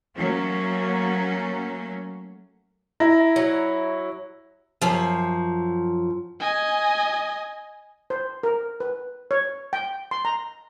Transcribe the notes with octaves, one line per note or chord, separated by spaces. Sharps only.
F#3 A3 A#3 C#4
E4 E5 A#5 A#6
F#3
F#2 F3
D#5 G#5
C5
A#4
B4
C#5
G5
C6
A#5